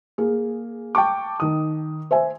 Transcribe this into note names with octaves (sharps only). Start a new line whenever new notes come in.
A#3 G#4
G5 A5 C#6 D6
D#3 D#6
C5 E5 G#5